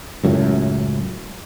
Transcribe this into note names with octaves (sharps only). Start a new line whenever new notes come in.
C#2 F#2 A2